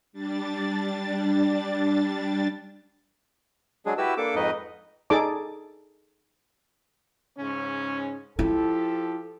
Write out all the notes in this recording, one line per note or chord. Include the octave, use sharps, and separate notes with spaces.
G3 D4 A6
F#3 G#3 D4 G#4
E4 F#4 G4 B4 E6
A#3 D4 A4 D6
F2 G#2 D#4 B4 D#5
D#4 G#4 A4 D5 A5 D6
G#2 C#3 C#4
F3 E4 G4 A4